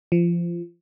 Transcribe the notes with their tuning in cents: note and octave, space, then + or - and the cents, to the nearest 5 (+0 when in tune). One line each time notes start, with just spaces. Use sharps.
F3 -25